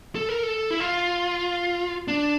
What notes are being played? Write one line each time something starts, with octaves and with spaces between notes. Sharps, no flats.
A4
A#4
A4
E4
F4
D4